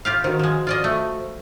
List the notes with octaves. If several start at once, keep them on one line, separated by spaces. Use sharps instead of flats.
F4 G4 F5
D#3 F#4 C5
F3 G#3
F4 D5 D#5
A3